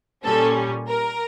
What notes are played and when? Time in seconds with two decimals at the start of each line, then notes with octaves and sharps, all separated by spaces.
0.24 A#2 G3 C#4 A4
0.88 A#4